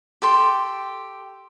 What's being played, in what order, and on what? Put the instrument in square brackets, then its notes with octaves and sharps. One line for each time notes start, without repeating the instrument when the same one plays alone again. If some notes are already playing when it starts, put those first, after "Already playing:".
[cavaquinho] G4 A4 G5 C6